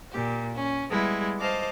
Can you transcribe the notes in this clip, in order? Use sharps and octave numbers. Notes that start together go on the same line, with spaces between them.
A#2 G4
C#4
G3 G#3 B3 E4
C5 D#5 F5 A5 D6